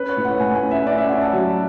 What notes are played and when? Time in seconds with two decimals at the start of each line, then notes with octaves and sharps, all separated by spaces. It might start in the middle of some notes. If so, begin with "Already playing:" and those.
Already playing: C#4 B4
0.09 C#5
0.17 A2
0.25 F#5
0.40 A2 G#5
0.55 G#5
0.63 C#4
0.71 E5
0.86 C#4 D5
0.98 E5
1.09 C#4 F#5
1.21 A5
1.33 F#3